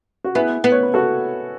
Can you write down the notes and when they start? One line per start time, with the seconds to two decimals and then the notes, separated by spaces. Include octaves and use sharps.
0.24 F#4
0.35 B3 E4 G#4
0.64 B3
0.72 C#5
0.83 B4
0.94 F#4 A4